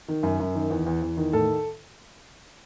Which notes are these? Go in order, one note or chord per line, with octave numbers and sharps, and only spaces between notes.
D#3
F#2
F#2
D#3
E2
E2
E2
D#3
A2 A4